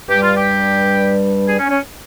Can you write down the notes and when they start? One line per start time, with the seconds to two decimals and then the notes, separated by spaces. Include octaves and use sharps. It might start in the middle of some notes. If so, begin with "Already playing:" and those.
0.09 G2 G3 G4
0.22 F4
0.35 G4
1.47 G#4
1.59 C#4
1.70 C#4